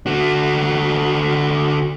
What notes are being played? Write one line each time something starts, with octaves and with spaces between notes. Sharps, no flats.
D3 F#4